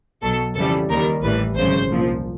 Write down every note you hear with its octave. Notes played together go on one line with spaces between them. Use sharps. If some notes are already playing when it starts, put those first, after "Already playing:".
B1 B2 F#3 A4
F2 C#3 E3 G3 A4
D#2 D#3 G3 A#4
A1 A2 E3 G3 B4
G#1 F#2 C#3 C5
C2 A#2 F3